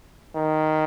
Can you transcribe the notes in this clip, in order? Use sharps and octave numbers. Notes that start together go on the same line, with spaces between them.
D#3